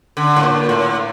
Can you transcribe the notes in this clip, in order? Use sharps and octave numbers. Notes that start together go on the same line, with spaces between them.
D3
A2
A#2
A2